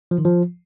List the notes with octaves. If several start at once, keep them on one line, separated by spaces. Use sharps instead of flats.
F3
D#3
F3